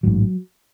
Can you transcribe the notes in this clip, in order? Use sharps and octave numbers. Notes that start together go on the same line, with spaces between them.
A1 G#2 F#3